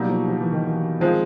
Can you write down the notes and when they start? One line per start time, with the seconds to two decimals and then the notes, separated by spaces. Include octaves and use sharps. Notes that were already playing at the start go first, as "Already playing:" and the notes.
Already playing: B2 F#3 G3 A#3 D#4
0.09 F3
0.28 F3
0.41 E3
0.52 D#3
0.66 E3
1.00 D#3 F3 G#3 C4 F4